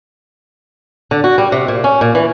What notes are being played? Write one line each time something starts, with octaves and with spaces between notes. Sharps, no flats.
D3
F#4
G3
C3
A#2
C#4
A#2
E3